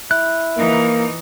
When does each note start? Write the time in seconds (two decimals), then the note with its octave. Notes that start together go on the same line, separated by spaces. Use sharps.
0.11 E4 F#6
0.57 E3 A#3 D#4